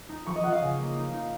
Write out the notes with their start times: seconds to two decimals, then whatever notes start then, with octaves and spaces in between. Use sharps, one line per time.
0.09 D#4
0.27 F3 C#6
0.36 D#5
0.44 F3 F#5
0.52 F5
0.61 C#3
0.79 A#3
0.96 D#4
1.13 D#4